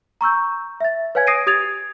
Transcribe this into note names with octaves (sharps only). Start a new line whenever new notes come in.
A#5 C#6 E6 G6
E5 A6
B4 C#5 F5 G#5 G#6
D#6 A#6 C7 D7 D#7
G4 D#6 G#6 A6 F7